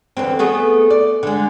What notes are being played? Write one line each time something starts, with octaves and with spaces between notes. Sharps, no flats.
E2 D3 C4
A3 B3 G#4
D5
D3 G#3